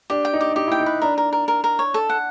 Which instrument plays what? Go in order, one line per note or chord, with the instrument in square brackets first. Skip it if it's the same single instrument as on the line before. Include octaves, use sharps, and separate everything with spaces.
[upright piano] D4 [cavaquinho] G4
[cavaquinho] G5
[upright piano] D#4
[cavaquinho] G4
[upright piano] D#4 [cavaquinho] G4
[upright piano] E4
[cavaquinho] G5
[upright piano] D#4
[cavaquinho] B4
[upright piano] D4 [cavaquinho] A#4
[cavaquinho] A#4
A#4
A#4
A#4
C#5
A4
F#5